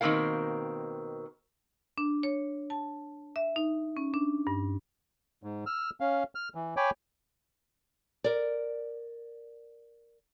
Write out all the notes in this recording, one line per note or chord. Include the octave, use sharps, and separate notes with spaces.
B2 D#3 A#3 C4 A#4 F5
D4
C#5
A5
E5
D#4
C#4
D4
G2
G#2
E6 F6
C#4 F5
F6
E3
C#5 G5 G#5 B5 D6
A#4 D5